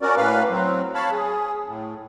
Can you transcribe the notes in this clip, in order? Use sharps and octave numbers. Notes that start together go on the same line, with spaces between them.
C#4 F#4 A#4 D5
A2 A#3 B4 F5
F#3 C4
C#5 F5 A5 B5
G#4
A2